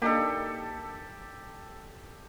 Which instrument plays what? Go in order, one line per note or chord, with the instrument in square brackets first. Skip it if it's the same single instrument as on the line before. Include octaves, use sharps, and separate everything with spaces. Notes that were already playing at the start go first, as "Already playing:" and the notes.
[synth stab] A#3 D4 D#4 [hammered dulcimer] G4 A4